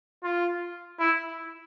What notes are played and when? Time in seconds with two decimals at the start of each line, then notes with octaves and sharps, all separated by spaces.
0.23 F4
0.99 E4